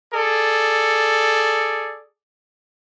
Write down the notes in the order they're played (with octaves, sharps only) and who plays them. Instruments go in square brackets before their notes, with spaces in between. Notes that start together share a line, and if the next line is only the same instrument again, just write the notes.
[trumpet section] G#4 A4 D5